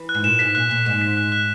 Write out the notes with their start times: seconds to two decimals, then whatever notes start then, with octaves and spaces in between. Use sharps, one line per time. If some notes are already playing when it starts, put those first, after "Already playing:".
Already playing: E3
0.09 F#6
0.14 G#2
0.24 A#2 E7
0.39 G#2 B6
0.55 A#2 F#6
0.70 A#2 F#6
0.86 G#2 E7
1.02 B6
1.17 F#6
1.32 F#6